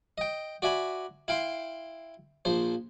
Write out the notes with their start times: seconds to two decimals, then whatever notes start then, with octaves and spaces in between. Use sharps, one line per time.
0.18 D#5 G5
0.62 F#4 D5 E5 G#5 B5
1.28 E4 F5 G5 C6
2.45 A#1 F3 C5